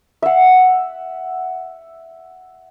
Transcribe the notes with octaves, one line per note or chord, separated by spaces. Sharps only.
E5 F#5